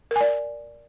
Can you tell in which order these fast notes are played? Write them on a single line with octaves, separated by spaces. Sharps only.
A#4 G#5 D5